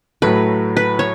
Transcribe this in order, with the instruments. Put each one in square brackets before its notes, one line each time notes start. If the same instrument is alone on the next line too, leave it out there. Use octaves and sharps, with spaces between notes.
[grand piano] A2 F#3 A3 [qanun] B4
[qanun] B4
C#5